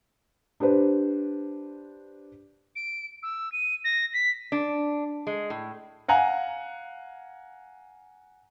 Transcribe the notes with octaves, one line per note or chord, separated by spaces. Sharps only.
D4 G4 B4 C5
D7
E6
D#7
A#6
B6
D4
G#3
A2
F5 F#5 G#5 A#5